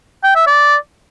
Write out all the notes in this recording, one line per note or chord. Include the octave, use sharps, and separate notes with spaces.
G5
E5
D5